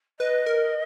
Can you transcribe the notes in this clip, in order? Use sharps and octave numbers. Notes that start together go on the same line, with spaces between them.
B4 D#5
A#4